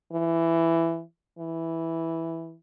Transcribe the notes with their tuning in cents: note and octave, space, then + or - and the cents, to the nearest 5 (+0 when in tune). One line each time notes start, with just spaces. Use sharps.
E3 +10
E3 -5